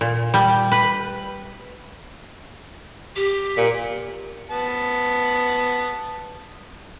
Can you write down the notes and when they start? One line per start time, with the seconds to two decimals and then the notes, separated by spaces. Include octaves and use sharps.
0.01 A#2
0.34 G3
0.72 B4
3.16 G4
3.58 A#2
4.51 B3 A5